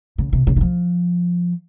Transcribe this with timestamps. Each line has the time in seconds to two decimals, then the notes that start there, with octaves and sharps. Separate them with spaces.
0.18 C#3
0.33 C3
0.47 C#3
0.56 D#3
0.61 F3